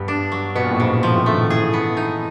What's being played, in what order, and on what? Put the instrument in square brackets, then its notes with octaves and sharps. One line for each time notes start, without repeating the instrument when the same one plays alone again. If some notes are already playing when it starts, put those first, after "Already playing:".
Already playing: [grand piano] G2 [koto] B3
[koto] D4
F#3
[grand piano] B2 [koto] B3
[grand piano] A#2
A2
[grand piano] G#2 [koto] C#3
[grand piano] G#2
[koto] F3
[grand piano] A2
[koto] A3
[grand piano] D#3
[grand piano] E3 [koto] G#4
[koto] B3
D#4